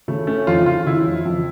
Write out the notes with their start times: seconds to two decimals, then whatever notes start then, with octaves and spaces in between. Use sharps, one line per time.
0.08 C#3 A3
0.27 A3 C#4
0.47 F2 F4
0.66 C#3 F4
0.86 C#3 E4
1.06 F2
1.25 F2